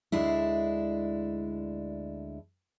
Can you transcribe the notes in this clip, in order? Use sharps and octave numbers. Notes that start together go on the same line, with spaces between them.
D2 G#3 D4 E4